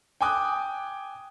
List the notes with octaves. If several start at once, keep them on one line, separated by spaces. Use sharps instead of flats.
G5 G#5 D6 D#6 F#6